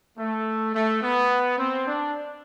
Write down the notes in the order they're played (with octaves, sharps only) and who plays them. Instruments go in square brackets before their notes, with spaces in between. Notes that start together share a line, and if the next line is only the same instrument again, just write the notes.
[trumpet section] A3
A3
B3
C4
D4